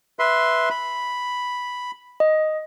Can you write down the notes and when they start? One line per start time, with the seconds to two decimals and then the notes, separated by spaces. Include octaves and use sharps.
0.19 B4 E5 C6
0.70 B5
2.20 D#5